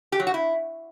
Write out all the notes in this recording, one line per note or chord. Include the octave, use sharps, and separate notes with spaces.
G4
F#3
F#4
E4